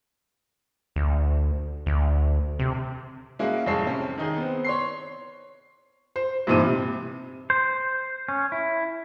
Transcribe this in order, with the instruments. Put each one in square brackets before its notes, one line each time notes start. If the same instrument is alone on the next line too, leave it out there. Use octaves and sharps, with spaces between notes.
[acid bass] D2
D2
C3
[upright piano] G#3 A#3 C#4 E4 F#4
F1 A2 G#3 C#5 A5 C7
C3 C#4
D#3 D#4 G#4
B3 C4
C#5 C6 C7
[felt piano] C5
G2 A#2 E3 C4 D#4 D#7
C3
[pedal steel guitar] C5
C#4
E4